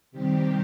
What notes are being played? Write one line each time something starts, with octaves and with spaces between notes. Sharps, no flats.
C3 D#3 G3 C4 G4